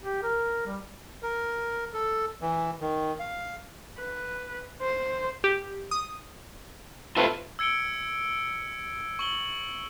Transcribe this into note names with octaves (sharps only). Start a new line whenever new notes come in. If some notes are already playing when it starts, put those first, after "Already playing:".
G4
A#4
G3
A#4
A4
E3
D#3
F5
B4
C5
G4
D#6
A3 C4 F4 B4 E5
E6 G#6 C#7 D7 G7
C#6 F#7 G7